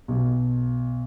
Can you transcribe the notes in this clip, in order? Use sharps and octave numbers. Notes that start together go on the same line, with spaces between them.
B1